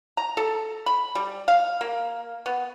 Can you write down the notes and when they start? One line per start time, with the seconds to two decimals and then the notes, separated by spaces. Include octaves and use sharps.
0.17 A#5
0.37 A4
0.86 B5
1.15 G3
1.48 F5
1.81 A#3
2.46 B3